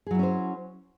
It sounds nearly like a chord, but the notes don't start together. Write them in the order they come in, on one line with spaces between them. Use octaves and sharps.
G#4 F#3 E4 C#4 C5